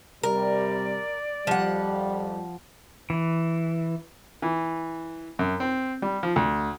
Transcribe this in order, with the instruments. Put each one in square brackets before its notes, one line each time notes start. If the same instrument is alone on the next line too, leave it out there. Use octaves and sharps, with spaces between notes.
[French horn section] C3 G3 [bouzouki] A#4 [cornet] D5
[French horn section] F2 G3 [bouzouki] F3 F#5
[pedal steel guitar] E3
[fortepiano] E3
F#2
C4
G3
F3
D2